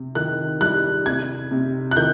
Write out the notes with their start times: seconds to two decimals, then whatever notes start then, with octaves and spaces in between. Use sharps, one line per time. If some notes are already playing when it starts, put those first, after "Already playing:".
Already playing: C3
0.15 D#3 F#6
0.61 G3 F#6
1.06 C3 G#6
1.51 C3
1.91 F#6
1.97 D#3 G6